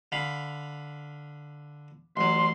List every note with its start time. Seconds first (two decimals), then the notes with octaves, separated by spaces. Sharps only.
0.12 D3 F5 B5
2.17 A1 F#3 C6